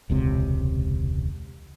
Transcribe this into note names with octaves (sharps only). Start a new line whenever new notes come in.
E1 C#2 C3